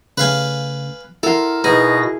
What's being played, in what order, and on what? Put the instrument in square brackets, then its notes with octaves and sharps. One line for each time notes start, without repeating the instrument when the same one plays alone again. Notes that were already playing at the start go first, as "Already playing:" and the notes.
[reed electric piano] C#3 A3 [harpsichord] B4 F5 G#5
[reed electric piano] E4 F#5 [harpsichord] A4 [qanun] A#4 C6
[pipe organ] B2 A#6 [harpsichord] D#4 [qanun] E4 G#4 [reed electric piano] B4